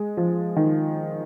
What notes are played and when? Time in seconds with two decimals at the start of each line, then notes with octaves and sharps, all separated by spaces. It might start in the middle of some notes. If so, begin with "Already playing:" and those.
Already playing: G#3
0.17 F3
0.56 D#3